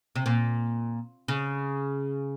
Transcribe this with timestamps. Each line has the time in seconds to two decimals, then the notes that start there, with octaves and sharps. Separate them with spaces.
0.16 C3
0.26 A#2
1.28 C#3